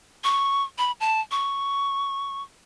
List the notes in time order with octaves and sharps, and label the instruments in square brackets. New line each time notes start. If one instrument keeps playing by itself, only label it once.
[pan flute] C#6
B5
A5
C#6